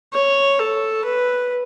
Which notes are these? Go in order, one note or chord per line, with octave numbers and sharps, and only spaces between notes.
C#5
A4
B4